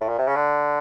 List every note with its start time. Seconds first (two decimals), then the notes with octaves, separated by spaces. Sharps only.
0.01 A2
0.09 A#2
0.19 C3
0.27 C#3
0.35 D3